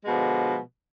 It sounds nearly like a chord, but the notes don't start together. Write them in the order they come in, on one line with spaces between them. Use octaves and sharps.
G#3 B2 F3 D3